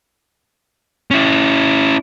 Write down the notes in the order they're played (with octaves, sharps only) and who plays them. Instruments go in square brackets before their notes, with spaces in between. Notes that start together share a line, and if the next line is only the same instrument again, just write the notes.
[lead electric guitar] C#4 E4